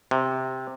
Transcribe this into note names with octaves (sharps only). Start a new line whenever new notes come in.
C3